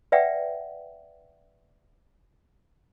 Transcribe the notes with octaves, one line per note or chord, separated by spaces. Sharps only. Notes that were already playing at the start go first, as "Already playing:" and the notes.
B4 D5 E5 F#5 G5